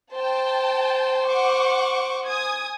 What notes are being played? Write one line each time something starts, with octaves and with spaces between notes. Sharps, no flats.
C5 G5 A5
F#5 C#6 D6
G#5 D#6 G#6